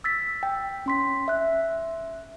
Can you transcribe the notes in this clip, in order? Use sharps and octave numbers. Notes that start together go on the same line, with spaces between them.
E6 A6 B6
G5
C#4 C6 B6
E5 F#6